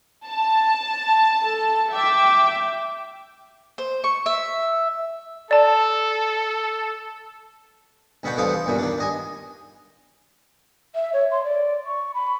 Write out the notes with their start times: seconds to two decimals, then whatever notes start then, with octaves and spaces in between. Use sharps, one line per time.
0.26 A5
1.43 A4
1.92 E5 G5 D6
3.78 C5
4.04 C#6
4.26 E5
5.51 A4 D5 A5
8.23 D2 B2 B3 F#4 G5
8.37 C2 D3 E3 C5 F5 D#6
8.53 C6
8.66 E2 G2 A#2 C#3
8.78 D#3 D4
8.98 G2 D#5 G#5
10.95 E5
11.13 C#5
11.31 C6
11.44 D5
11.86 C#6
12.14 B5